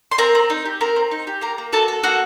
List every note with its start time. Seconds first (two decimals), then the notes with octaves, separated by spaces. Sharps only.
0.12 C6
0.18 C4 A#4 A#5
0.35 C4
0.50 D#4
0.65 G4
0.81 C4 A#4 A#5
0.96 C4
1.11 D#4
1.27 G4
1.41 A#3 A#4 A#5
1.58 A#3
1.73 F#4 A4 A5
1.88 A4
2.03 A#3 F#4 F#5